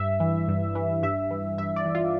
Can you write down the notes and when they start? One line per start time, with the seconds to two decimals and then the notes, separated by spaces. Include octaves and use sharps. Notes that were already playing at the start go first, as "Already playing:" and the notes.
Already playing: G2 E5
0.20 E3
0.48 G2
0.75 E3
1.03 G2 E5
1.31 E3
1.58 G2 E5
1.76 D5
1.86 E3
1.95 F4